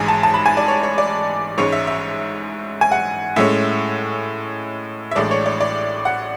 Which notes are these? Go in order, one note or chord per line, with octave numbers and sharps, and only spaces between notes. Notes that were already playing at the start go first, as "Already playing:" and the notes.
Already playing: A1 G#2 G#3 G#5
A5
A5
B5
G#5
D5
C#5
C#5
D5
A1 G#2 G#3 C#4 C#5
E5
E5
G#5
F#5
A2 G#3 C#4 E5
E5
A1 A2 G#3 D4 D5
C#5
D5
D5
F#5